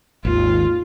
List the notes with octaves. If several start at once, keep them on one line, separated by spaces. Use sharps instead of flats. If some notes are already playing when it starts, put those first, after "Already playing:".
G#1 D#2 F4